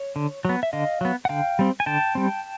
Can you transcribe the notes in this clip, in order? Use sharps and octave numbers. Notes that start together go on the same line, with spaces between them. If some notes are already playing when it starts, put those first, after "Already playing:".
Already playing: C#5
D3
F#3 B3
E5
D3 D#5 F5
F#3 B3
F#5
D3 F5 G5
G3 C4
G#5
D3 G5 A5
G3 C4